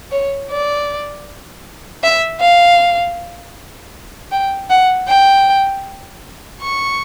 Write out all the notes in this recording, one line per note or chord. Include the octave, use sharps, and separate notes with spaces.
C#5
D5
E5
F5
G5
F#5
G5
C#6